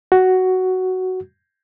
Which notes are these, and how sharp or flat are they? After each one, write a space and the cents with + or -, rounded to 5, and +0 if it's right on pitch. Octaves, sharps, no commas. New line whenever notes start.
F#4 +5